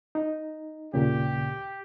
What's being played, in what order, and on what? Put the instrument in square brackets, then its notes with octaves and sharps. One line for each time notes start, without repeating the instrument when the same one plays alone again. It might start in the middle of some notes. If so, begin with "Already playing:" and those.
[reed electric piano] D#4
[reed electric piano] D#2 A#2 C#3 [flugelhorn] G4